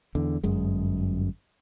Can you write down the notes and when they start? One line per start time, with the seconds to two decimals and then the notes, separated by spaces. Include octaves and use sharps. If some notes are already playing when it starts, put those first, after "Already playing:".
0.15 E2 D3
0.43 G1 F#2 G#3